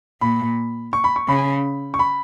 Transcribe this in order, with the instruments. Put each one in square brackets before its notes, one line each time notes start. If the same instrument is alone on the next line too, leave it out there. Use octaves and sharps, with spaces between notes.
[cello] A#2 [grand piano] B5
[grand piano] C#6
B5
C#6
[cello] C#3 [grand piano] B5
[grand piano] C#6
B5